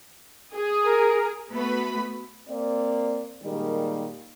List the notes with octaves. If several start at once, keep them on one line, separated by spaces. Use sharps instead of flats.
G#4
A#4 A#5
A3 B3 F#4 B4 B5
A#3 C4 D5
A#2 D#3 G3 G#3 A#3